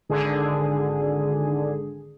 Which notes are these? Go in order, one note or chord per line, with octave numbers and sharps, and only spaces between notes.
G#1 D3 G#4